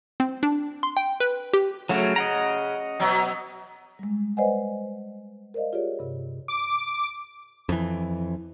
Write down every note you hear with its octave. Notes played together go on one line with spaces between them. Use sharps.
C4
D4
C6
G5
B4
G4
C#3 F#3 A3 F#4
D#5 F#5 A#5
B2 F#3
G3 G#3
B4 C5 D5 D#5 F#5 G#5
A#4 C5 D5 D#5 F5
F4 G4 G#4 C#5 D5
G2 C3
D6
F2 E3